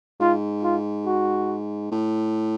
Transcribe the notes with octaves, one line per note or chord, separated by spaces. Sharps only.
G#2 F4
F4
F#4
A2